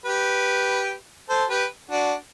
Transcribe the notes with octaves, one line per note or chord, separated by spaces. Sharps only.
G4 B4
A4 C5
G4 B4
D4 F#4